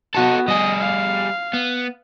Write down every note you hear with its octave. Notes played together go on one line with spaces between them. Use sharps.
B3 D#4 F#4 A4
G3 G#4 D#5
F5
B3